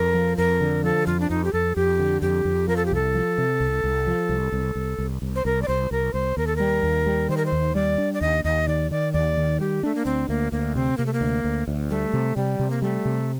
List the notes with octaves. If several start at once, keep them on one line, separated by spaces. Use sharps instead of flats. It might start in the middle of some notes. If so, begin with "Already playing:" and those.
Already playing: F2 A#4
F3
F2 A#4
D3
F3 A4
F2 F4
D4
F2 D#4
G4
F2 A4
F2 G4
D3
F2 G4
F2
F3 A#4
A4
G4
C2 A4
F3
C3
C2
C2
F3
C2
C2
C2
C2
C2
C5
C2 A#4
D5
C2 C5
C2 A#4
C2 C5
D#2 A#4
A4
G3 A#4
D#2
G3
D#3 C5
A#4
C5
D#2
G3 D5
D4
D5
D#2 D#5
D#2 D#5
D#3 D5
D#3 D5
D#2 D5
D#3
G3 G4
A3 D4
A#3
D2 C4
D2 A#3
D2 A#3
C3 C4
C3 A#3
A3
A#3
D2
D2
D2
G3 A3
C3
C3 G3
C3
A#3
G3 A3
C3